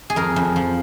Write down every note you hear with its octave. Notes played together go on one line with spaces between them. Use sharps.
G#4
F2 A#4
F2
F3